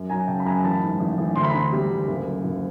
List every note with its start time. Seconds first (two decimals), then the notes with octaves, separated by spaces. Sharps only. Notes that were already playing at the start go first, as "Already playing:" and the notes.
Already playing: F#2
0.10 F#3 G#5 A#5
0.27 C#3 G5 A5
0.40 B5
0.45 F#2 G#5 A#5
0.64 A1 A5 B5
0.82 G#2
0.99 A1
1.18 A1
1.36 D2 C6
1.44 B5
1.51 D3 A#5 C6
1.72 G3
1.91 D2
2.08 F#1
2.25 F#2
2.44 F#1